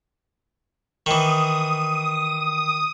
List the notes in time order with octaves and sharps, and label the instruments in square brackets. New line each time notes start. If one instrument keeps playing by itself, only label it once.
[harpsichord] D#3 E3 [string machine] D#6